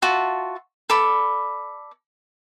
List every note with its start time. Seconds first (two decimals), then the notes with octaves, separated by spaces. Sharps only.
0.02 F4 F#4 E5 A5
0.90 A4 D5 B5